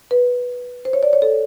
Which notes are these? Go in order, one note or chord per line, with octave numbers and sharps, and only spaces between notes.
B4
C5
C#5
D5
C#5
A4